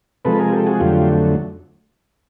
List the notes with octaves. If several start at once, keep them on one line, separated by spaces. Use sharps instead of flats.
C3 F3 G#3 A4 B4
G#4 A#4
G4 A4
F#4 G#4
F2 D3 F#3 A3 F4 G4